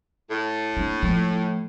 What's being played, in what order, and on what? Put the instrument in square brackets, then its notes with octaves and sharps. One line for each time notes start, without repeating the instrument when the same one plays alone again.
[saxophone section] A2
[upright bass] A#3 D4
F3 A3